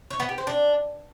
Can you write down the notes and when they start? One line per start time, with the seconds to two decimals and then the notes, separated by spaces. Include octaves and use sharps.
0.10 C#5
0.20 B3
0.29 G4
0.38 C5
0.47 D4